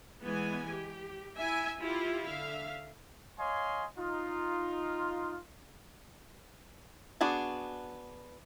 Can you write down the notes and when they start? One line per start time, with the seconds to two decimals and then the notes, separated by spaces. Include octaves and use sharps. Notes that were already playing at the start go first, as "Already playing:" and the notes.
0.23 E3 G#3 B3 G#5
0.69 G4
1.38 E4 E5 G#5
1.80 E4 F4 G4
2.27 D3 E5 F5
3.39 C#5 D#5 F5 G#5 C6
3.98 D#4 F4
7.21 B3 D4 F#4 G#4 A5